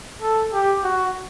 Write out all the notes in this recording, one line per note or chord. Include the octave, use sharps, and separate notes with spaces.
A4
G4
F#4